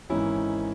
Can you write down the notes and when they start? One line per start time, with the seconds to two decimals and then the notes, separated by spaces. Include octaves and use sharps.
0.09 G#1 G#2 E3 C#4 E4